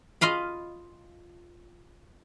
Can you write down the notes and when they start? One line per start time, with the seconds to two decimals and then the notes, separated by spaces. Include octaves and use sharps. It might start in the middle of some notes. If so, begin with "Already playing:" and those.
0.21 F4 D#5 F5 B5